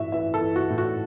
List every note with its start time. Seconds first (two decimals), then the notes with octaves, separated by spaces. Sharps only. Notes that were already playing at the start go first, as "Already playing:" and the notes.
Already playing: A2 E3 F#4 E5
0.12 E3 E5
0.34 A4
0.41 E3
0.56 F#4
0.70 A2
0.78 F#4